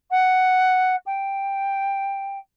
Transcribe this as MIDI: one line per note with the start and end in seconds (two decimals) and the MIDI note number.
0.10 0.96 78
1.06 2.38 79